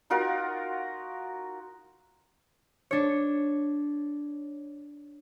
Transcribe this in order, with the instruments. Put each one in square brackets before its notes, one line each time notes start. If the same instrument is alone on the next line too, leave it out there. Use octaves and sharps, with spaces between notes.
[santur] D#4 F4 F#4 A#4
[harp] D4 C#5